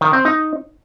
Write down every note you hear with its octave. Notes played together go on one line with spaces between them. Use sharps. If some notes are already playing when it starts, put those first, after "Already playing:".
D#3
C4
D#4